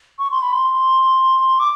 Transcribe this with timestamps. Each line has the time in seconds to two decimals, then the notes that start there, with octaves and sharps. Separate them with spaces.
0.19 C#6
0.31 C6
0.42 B5
0.54 C6
1.59 D6